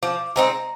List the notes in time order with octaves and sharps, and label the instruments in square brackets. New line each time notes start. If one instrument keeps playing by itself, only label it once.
[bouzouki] F3 [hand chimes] D6
[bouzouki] G#3 C4 D#4 [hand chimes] A#5